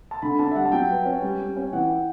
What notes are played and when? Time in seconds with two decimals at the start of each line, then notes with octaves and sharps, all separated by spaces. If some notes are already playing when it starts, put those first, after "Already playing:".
0.11 A5
0.22 D3 B5
0.39 D4 A5
0.51 E5
0.55 G3 F#5
0.65 A5
0.72 F#3 G5
0.89 B4
1.05 C#4
1.22 G3
1.40 G3
1.56 C#4
1.73 E3 F#5
1.90 E4